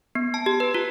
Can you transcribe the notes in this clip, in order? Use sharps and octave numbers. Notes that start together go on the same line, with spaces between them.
B3
A5
G4
B4
F4